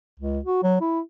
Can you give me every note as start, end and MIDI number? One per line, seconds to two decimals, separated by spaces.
0.20 0.40 37
0.45 0.60 66
0.63 0.78 54
0.81 1.00 64